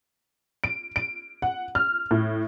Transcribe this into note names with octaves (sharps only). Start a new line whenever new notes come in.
D7
D7
F#5
F6
A2